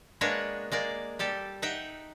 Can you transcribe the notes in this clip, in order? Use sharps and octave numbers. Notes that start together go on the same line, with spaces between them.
G#3 A#3 B3 D4 C#5 F#5
G#3 A#3 D5
G3 G4 A4
D#4 E5 F#5 G5